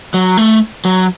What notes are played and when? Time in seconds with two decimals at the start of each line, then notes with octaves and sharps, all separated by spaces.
0.14 F#3
0.38 A3
0.85 F#3